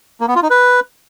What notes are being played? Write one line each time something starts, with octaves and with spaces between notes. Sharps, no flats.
A#3
B3
F4
D#4
B4